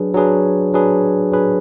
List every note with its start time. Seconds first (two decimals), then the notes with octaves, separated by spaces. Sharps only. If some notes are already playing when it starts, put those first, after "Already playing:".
Already playing: F#3 D4 G#4 B4
0.14 F#3 D4 G#4 B4
0.74 F#3 D4 G#4 B4
1.32 F#3 D4 G#4 B4